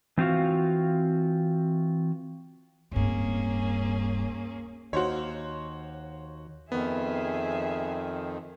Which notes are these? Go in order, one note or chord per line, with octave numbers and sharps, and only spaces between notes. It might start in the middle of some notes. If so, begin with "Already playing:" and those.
E3 C4 F4 F#4 F5
D1 G2 A#3 C#4 G#4
D#2 F#4 C5 C#5
F2 D#3 B3 G#4 E5